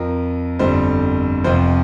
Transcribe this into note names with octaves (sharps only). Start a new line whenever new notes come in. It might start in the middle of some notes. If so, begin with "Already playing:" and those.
Already playing: F2 F3 A#4
G1 F2 D3 G3 C5
F1 F2 F3 C5